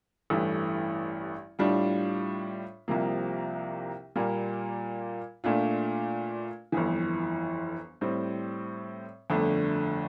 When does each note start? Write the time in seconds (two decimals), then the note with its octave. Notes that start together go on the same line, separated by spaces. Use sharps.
0.30 A1 G2 E3 A3
1.59 A2 G3 D4 F4
2.88 C2 C3 F3 A#3
4.16 A#2 G3 A#3 F4
5.44 A#2 A3 D4 F4
6.72 G1 F2 E3
8.01 A2 G3 C4
9.30 G1 F2 D3 A3 D4